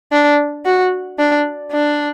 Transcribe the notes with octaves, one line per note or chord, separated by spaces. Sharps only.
D4
F#4
D4
D4